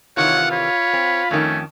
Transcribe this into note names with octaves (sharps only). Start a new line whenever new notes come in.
C3 D#3 E3 F4 C#5 F#5
C#5 B5
C4
F2 D#3 A3 C#4